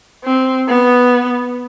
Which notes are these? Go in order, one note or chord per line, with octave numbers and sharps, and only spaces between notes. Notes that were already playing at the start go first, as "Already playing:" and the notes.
C4
B3